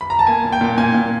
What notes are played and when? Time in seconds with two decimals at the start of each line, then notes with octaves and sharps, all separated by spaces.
0.01 B5
0.10 A#5
0.19 A5
0.27 A#3 G#5
0.45 A#2
0.52 G5
0.61 A#2
0.78 A#2 G#5
0.94 A#2